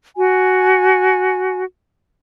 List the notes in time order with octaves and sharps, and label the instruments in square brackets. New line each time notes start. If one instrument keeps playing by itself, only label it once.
[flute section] F#4 G#5